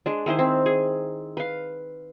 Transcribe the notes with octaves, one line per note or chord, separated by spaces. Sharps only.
G#3 D4
D#3 E4 G#4 C5
C4
G#4
B4 F5